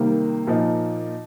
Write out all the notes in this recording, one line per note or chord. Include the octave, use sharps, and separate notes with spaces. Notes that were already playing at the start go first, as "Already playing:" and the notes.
Already playing: C3 D#3 G3 A#3
A#2 F3 D#4